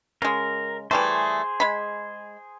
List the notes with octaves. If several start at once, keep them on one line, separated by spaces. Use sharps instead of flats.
C#3 G#3 A#4
E3 G3 A3 G#4 C5
G#3 B5